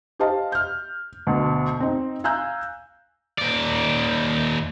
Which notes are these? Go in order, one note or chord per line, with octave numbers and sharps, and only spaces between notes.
G4 C5 D#5 F5 A5
F6 G6
D2 B2
C4 D#4
F5 G#5 A#5 E6 F#6 G6
D#2 D5